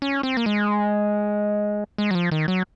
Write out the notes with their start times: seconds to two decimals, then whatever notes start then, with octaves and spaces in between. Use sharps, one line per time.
0.02 C#4
0.23 C4
0.37 A#3
0.46 G#3
1.98 G#3
2.11 F#3
2.15 F3
2.31 D#3
2.48 F#3